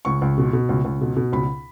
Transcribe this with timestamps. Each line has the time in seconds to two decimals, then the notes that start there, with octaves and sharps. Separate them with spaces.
0.05 C#2 C#6
0.22 C#2
0.38 B2
0.53 B2
0.69 C#2
0.84 C#2
1.01 B2
1.16 B2
1.32 C#2 B5